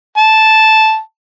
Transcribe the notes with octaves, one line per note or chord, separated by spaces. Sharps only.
A5